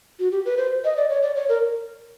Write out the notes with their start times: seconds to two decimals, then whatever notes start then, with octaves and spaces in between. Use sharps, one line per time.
0.19 F#4
0.32 G4
0.45 B4
0.58 C5
0.84 D#5
0.96 D5
1.10 C#5
1.23 D5
1.36 C#5
1.49 A#4